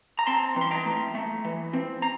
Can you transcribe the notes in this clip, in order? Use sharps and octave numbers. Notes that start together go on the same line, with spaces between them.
A#5
C4 A5 C6
E3 C6
G5 A#5
A3
A3
E3
C4
A#5